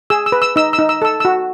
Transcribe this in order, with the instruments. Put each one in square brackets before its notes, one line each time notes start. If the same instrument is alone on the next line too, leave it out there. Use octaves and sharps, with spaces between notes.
[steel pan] G#4 E6
E6
B4
E6
D#4 E6
E6
D#4
E6
A4 E6
F#4 E6